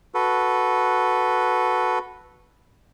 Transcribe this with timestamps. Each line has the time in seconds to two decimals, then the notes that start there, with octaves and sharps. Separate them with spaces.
0.14 F#4 A4 B4